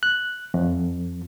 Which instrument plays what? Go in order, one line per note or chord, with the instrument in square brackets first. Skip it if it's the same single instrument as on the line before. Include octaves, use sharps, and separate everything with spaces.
[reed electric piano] F#6
F2